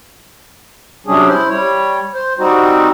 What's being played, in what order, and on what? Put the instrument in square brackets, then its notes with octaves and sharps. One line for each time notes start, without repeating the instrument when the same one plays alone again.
[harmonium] C3 F#3 G3 C#4 D4 G#4
E4 C5
G3 C#5
C5
G3 C4 D#4 F#4